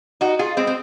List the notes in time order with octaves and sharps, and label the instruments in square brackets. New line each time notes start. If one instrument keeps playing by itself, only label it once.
[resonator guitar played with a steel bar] D#4 F#4
F4 G#4
G#3 C4
C4